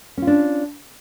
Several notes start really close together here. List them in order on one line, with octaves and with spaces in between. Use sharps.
C#4 F4 D4